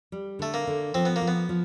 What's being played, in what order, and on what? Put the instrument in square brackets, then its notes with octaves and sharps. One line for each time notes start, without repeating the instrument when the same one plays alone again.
[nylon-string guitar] G3
[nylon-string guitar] D3 [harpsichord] A3
[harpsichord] A#3
[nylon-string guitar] D3
[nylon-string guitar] F3 [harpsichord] C4
[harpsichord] B3
A#3
[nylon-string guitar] F3
[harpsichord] B3
[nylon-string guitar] F3